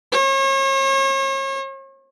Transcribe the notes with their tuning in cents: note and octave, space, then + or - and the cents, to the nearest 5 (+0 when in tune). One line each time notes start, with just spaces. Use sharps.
C#5 -40